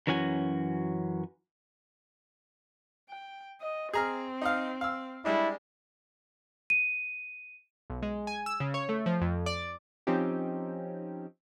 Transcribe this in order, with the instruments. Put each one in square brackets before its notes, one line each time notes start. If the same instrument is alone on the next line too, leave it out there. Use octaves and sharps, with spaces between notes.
[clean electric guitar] F#2 E3 C#4 F#4 G#5
[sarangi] G5
D#5
[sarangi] C4 [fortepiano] G#4 A#5 F6
[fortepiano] D#4 D#5 F5
F5 E6
[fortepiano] G3 G#3 D4 [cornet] E4
[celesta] D#7
[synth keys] B1
G#3
G#5
E6
C#3
C#5
A3
F3
F2
D5
F3 C4 C#4 D#4 G4